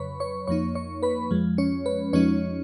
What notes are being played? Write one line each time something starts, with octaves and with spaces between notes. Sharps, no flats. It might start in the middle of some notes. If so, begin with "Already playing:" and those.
Already playing: F2 C#3 F#3 B4 C#5 B5 C#6
C#5 C#6
F2 F3 A#3 D#4 C#5 C#6
C#5 C#6
B4 B5
F2 F3 G#3
C#4 C#5
B4
F2 F3 G#3 C#4 D#4 C#5